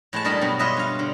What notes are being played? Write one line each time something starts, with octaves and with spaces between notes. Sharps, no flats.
A2 G#3 B4 A5
G2 G3 A#4 D#5 A5 B5
G2 B2 F#3
F4 B4 C#5 D#5 E5
G2 F5
D3